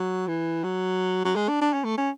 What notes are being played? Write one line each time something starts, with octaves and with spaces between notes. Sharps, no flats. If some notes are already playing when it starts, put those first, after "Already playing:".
Already playing: F#3
E3
F#3
F#3
G#3
D4
D4
C#4
A3
C#4